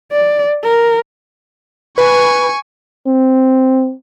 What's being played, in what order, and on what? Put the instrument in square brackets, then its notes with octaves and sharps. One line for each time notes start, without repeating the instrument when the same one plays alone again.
[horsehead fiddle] D5
A#4
[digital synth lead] B4 [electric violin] G#5 C#6
[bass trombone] C4